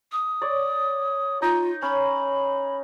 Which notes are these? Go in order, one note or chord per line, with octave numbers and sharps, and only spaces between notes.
D#6
C#5 D5
D#4 F4
C#4 B5